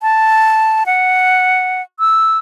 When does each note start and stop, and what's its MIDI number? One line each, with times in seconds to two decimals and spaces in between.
0.02 0.84 81
0.86 1.82 78
1.99 2.38 88